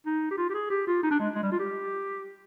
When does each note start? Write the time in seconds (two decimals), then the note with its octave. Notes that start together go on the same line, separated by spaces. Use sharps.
0.06 D#4
0.31 G4
0.38 F4
0.50 G4
0.54 G#4
0.70 G4
0.87 F4
1.03 D#4
1.11 D4
1.19 G#3
1.35 G#3
1.43 G3
1.52 F4
1.59 G4